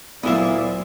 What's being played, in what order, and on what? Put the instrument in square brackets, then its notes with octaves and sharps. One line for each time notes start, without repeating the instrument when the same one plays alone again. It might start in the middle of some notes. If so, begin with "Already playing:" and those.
[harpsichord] D2 A#2 F5 [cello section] F#3 [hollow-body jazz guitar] B3 E4 E5 [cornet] D5